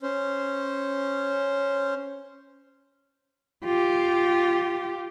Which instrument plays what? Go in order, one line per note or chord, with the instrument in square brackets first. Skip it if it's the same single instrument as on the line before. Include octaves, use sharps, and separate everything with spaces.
[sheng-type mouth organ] C#4 C5
[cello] F4 G4